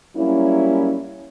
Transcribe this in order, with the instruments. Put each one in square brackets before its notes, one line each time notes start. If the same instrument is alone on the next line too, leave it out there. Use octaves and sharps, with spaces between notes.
[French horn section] F#3 G3 A#3 C#4 E4